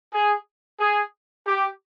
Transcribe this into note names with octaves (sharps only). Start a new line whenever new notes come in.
G#4
G#4
G4